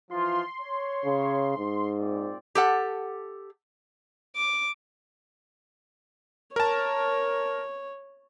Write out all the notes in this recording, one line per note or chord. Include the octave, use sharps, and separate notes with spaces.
E3 F3 F4 C6
C#5
C#3
G#2
A#2 C4 D5
G4 A4 F#5
D6
A#4 C#5 A5